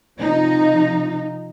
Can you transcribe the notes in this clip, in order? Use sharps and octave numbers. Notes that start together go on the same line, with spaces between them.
C3 F3 D#4